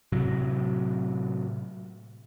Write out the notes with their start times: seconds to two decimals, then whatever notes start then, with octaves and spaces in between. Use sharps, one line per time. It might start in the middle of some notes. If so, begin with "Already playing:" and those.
0.12 A2 C3 F#3